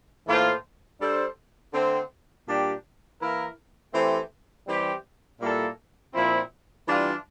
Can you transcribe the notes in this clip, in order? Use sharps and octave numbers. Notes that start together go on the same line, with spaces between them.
A2 E3 A#3 F4 C5
G3 D4 A4 C5
D3 A3 C4
A#2 G3 D4 G4
E3 A#3 E4 A#4
E3 A3 C4 G4 C5
E3 G3 C4 G4
A#2 G3 A#3 E4 A4
A#2 F3 C4 E4
E3 G3 D4 F4